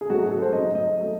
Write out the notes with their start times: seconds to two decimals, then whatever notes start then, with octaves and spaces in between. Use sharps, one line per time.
0.01 G#4
0.10 G#2 F#3 A3 F#4
0.20 G#4
0.31 A4
0.42 C5
0.53 G#2 F#3 A3 D#5
0.75 D#5
0.98 F#3 A3